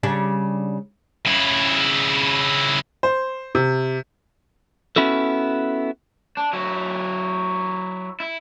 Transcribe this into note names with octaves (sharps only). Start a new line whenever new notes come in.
C#3 G3 D4
C#3 E4
C5
C3
B3 C#4 E4 F#4 A4
D4
F#3 E4
E4